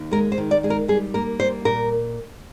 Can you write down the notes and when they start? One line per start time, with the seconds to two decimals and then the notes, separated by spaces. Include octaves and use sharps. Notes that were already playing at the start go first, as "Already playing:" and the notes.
Already playing: D#2
0.11 G#3 A#4
0.32 C5
0.38 D#3
0.51 D5
0.63 G#3 G#4
0.70 A#4
0.88 G3 G#4
1.14 A#3 A#4
1.40 G3 C5
1.65 A#2 A#4